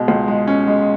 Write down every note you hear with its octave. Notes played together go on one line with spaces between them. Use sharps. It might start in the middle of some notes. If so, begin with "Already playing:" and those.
Already playing: B2 G#3
C#2
G#3
C#4
G#3